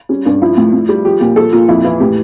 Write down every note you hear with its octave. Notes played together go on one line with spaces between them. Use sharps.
G3 C#4
G2 D4
F3 E4
A2
A2
G3
F3 G4
A#2 G4
F3 A4
A#2 F4
F2 E4
E3 E4
A2 G4